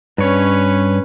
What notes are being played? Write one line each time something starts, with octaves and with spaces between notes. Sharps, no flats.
G2 C#4 B4 C#5